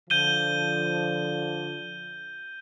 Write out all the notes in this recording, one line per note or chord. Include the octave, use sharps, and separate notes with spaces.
D3 F3 G6 D#7 G7